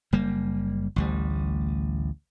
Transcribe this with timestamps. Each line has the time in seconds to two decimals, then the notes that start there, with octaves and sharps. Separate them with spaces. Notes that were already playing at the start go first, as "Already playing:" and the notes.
0.13 F#1 G3 A#3
0.96 A1 D2 G3